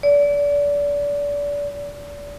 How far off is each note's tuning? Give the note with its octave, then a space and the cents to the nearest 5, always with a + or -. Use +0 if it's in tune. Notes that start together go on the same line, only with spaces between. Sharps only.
D5 -30